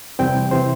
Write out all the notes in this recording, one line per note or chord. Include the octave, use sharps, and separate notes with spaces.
E2 C3 E3 G3 C4 G5
C3 E3 C4 C5